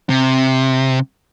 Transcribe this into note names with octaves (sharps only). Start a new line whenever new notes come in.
C3